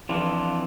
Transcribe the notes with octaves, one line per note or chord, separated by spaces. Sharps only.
F2 E3 D4 F4